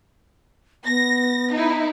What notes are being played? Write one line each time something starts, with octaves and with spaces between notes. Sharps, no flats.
B3 A#6
D#4 E4